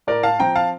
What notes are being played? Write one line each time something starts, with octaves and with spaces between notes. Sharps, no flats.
A2 A#4 D5
F5 A5
F3 C4 G5 A#5
F5 A5